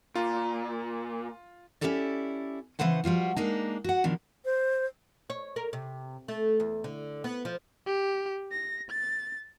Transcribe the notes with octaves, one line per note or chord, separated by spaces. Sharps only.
A#2 F4
C#4 D4 E4 G4 A4 D5
C#3 E3 B3 B4 C5 F#5
F3 G3 F4 F#4
G#3 A#3 D4 D#4
F#4 F#5
B2 D#3 F3 D4
C5
C#5
A#4
C3
A3
E2
D3
B3
F3
G4
A#6
A6